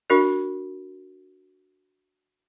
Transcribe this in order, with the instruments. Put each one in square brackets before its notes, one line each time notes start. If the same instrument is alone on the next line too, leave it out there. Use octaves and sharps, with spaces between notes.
[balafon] D4 F#4 A#4